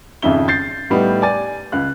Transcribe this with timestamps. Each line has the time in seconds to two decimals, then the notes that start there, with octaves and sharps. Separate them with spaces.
0.22 G#1 F2 C#3 E5 G7
0.48 G6 A6 C7
0.90 A2 G3 B3 D#4
1.22 D5 G#5 A6
1.72 C#2 F5 F#6